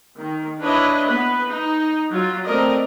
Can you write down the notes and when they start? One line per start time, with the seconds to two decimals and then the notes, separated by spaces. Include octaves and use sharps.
0.18 D#3
0.60 D4 E4 B4 C#5 D#5
1.06 B3 B4
1.47 D#4
2.10 F#3 F4
2.45 A3 C4 A#4 D5 D#5